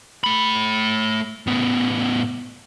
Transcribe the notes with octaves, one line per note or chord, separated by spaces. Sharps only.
A3 B5
A2 B3